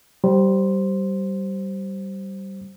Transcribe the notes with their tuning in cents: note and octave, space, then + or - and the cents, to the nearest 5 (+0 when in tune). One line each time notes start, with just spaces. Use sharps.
G3 -20 C5 +0